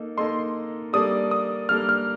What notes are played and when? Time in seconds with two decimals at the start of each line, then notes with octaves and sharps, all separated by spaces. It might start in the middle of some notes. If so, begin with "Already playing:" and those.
Already playing: A#3 D#4 A4
0.17 A#3 D#4 A4 D#5 C6
0.93 G3 A#3 D4 A4 D5 D#6
1.31 D#6
1.69 G3 A#3 D4 A4 D5 F6
1.89 F6